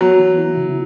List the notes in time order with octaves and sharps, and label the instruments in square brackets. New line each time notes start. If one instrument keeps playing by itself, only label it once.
[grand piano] F#3 [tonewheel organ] B3
[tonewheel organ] E3
E4
C#3